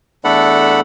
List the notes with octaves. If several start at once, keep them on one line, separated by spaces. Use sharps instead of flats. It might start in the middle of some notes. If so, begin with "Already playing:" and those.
E2 A3 D4 A4 F#5 B5